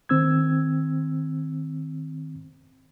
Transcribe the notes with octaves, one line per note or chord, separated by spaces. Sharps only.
D#3 C4 E6 G#6